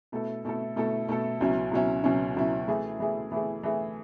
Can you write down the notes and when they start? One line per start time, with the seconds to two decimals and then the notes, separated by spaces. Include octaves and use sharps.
0.12 B2 A3 E4 A4
0.45 B2 A3 E4 A4
0.76 B2 A3 E4 A4
1.09 B2 A3 E4 A4
1.41 C#2 B2 F#3 C#4 E4
1.71 C#2 B2 F#3 C#4 E4
2.04 C#2 B2 F#3 C#4 E4
2.36 C#2 B2 F#3 C#4 E4
2.68 E3 A3 E4 G#4
3.00 E3 A3 E4 G#4
3.32 E3 A3 E4 G#4
3.63 E3 A3 E4 G#4